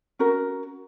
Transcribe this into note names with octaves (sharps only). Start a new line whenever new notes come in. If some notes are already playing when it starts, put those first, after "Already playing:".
C#4 F#4 A#4